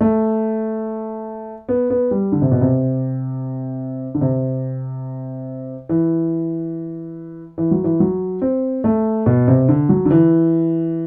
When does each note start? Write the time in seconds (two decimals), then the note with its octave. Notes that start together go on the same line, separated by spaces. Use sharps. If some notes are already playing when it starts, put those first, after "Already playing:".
0.01 A3
1.69 B3
1.90 B3
2.11 G3
2.32 D3
2.42 C3
2.52 B2
2.61 C3
4.15 D3
4.21 C3
5.89 E3
7.58 E3
7.71 F#3
7.84 E3
8.00 F#3
8.42 C4
8.84 A3
9.26 B2
9.48 C3
9.69 D3
9.89 F#3
10.05 D3
10.11 E3